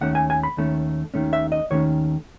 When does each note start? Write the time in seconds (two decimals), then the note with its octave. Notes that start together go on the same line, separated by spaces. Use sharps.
0.01 D#2 D#3 A3 C#4 F#5
0.15 G#5
0.30 G#5
0.43 B5
0.57 D#2 D#3 A3 C#4
1.14 D#2 D#3 A3 C#4
1.33 E5
1.52 D#5
1.70 D#2 D#3 A3 C#4 C#5